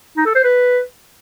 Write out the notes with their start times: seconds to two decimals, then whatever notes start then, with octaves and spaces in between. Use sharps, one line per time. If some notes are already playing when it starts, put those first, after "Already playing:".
0.17 D#4
0.26 A4
0.35 C5
0.44 B4